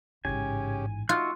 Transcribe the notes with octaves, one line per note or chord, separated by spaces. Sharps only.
A1 G#2 C#3 C#4 G4 G#5
D#4 F4 F#4 C#6 E6 F#6